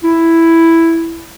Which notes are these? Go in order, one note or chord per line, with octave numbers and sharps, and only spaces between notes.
E4